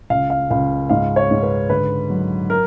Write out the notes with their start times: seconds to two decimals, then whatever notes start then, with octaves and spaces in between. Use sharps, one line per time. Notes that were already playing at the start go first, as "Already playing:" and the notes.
0.10 C#2 F5
0.30 F5
0.50 C#2 F5
0.89 G#2 F5
1.16 C#5
1.31 G#2
1.43 B4
1.70 D3 B4
2.10 F#3
2.50 A#4